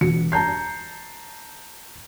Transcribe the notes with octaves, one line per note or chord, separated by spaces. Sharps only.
E1 F#4 C#7
A5 A#5 G6 C7